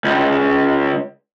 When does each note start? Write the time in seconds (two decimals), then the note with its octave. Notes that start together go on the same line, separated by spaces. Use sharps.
0.04 C#2